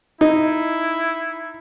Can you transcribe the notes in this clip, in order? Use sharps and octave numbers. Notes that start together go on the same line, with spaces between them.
D#4 E4